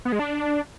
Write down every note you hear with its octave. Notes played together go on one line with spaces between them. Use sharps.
B3
G#3
D4